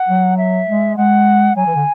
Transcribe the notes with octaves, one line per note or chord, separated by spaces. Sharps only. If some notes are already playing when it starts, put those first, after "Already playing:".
Already playing: F#5
F#3
E5
G#3
G#3 F#5
F#3 G#5
E3
D3